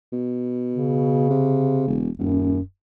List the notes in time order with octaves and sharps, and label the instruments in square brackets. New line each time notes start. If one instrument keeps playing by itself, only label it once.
[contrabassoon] B2
[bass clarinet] C#3
[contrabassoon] C3
E1
[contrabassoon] D#1 [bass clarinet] F#2